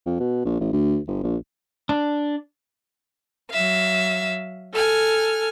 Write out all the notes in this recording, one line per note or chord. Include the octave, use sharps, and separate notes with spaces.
F2
B2
A#1
A1
D2
G1
A#1
D4
F#3 E5 F5
A4 G#5 F6